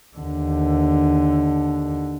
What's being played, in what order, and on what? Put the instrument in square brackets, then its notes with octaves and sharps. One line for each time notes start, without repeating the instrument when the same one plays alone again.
[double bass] D#2 D3